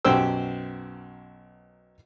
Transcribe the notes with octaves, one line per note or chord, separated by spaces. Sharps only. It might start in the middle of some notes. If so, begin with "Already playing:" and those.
B1 F#2 G4 C5 G5 E6